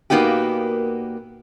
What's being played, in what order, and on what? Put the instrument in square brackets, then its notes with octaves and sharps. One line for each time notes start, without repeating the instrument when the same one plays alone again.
[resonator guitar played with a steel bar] A#2 A#3 B3 D#4 F#4 G4